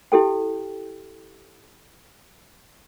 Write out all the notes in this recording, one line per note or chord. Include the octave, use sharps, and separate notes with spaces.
E4 G4 A4 G5